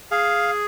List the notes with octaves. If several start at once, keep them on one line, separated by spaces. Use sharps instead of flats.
G#4 F5